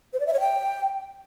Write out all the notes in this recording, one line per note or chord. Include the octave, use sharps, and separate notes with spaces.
C5
D5
E5
C#5
G5